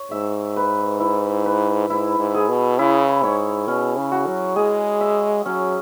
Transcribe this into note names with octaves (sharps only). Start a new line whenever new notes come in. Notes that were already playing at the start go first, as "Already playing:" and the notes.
Already playing: C#5
G#2 E5
B4
E4
B4
G#2 E4
G#2
G#4
B2
C#3 E4
G#2 C#5
B2 C#4
C#3
F#4
F#3
G#3 G#4
E5
F#3 C#4